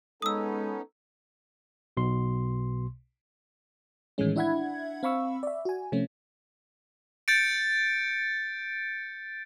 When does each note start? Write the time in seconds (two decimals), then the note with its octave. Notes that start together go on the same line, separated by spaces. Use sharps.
0.22 G#3 B3 C#4 D#4 A4 D#6 E6
1.97 B1 B2 C6
4.18 A2 D#3 E3 G#3 C#4
4.36 D4 E4 E5 F#5 B5 G#6
5.03 C4 F5 B5 C#6 E6
5.43 D5 E5
5.65 F#4 G#5
5.92 C3 F3 A3 C#4
7.28 G6 A6 C#7 D7